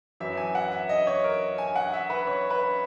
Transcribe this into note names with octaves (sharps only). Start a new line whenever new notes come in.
F#2 E3 E5
G#5
F#5
E5
D#5
C#5
A#4
G#5
F#5
E5
B4
C#5
B4